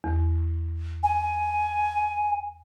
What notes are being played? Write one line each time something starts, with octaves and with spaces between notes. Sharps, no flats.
E2
G#5